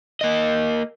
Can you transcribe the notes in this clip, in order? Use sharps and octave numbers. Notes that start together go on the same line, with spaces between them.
A#3 D#5